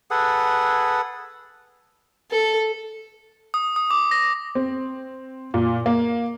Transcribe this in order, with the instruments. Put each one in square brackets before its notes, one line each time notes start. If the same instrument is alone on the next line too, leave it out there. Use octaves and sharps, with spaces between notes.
[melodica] G#4 A4 B4 F#5
[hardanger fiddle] A4
[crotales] D#6
D#6
D6
A#6
[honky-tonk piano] C4
A#2
A#3